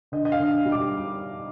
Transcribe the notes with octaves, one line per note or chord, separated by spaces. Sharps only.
D3 D#5
D#5
F5
D3
G3
D6